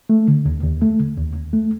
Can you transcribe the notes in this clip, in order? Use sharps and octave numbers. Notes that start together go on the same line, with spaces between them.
A3
D3
D#2
D#2
A3
D3
D#2
D#2
A3